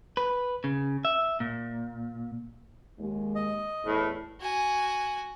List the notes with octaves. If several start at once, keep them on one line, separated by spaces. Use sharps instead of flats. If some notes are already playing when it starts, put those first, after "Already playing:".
B4
C#3
E5
A#2
D#2 G#3
D#5
E2 A2
F#4 G#5